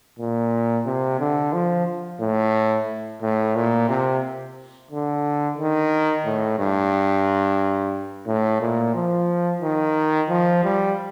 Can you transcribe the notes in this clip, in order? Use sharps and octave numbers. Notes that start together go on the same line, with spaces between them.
A#2
C3
D3
F3
A2
A2
A#2
C3
D3
D#3
A2
G2
A2
A#2
F3
D#3
F3
G3